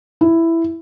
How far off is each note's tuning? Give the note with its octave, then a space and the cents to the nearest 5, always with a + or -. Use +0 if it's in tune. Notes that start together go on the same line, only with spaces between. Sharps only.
E4 +5